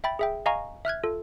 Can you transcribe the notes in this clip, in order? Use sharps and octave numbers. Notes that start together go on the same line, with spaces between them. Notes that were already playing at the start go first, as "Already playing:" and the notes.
E5 G5 B5 A6
G#4 E5 G5
D#5 F5 G#5 A#5 C#6
E5 F6 F#6 G#6
F4 A4